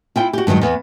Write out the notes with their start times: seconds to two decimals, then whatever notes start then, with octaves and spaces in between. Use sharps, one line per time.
0.16 E4 F4 G5
0.33 F#4 G4
0.47 G2 D#3 E3 F#3 G#3
0.61 E2 B3